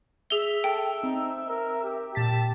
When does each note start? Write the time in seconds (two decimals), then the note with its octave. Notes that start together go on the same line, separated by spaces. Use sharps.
0.30 G#4 E5 G7
0.64 A4 G5
1.03 C4 D#4
1.48 A#4
1.84 G4
2.15 A#2 G4 A5 A6 B6